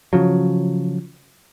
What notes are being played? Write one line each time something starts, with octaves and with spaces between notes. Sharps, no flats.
C#3 F3 F#3